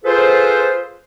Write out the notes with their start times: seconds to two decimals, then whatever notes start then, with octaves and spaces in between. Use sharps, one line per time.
0.05 F4 G#4 A4 B4 C5